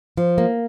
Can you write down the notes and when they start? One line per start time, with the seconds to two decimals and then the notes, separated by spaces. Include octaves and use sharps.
0.17 F3
0.38 A#3